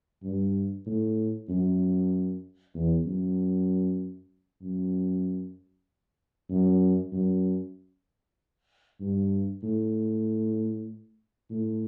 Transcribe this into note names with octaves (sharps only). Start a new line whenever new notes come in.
G2
A2
F#2
E2
F#2
F#2
F#2
F#2
G2
A2
A2